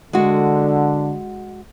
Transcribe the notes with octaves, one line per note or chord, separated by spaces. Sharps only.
D3 G#3 F#4